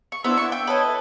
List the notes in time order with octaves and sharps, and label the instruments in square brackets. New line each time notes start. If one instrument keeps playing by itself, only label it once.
[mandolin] C#6
[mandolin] B3 C5 E5 [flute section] D4 E4 E6
[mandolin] E5 C#6
G5
[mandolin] B4 D#5 [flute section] C#5 A5 D#6
[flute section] A4 E5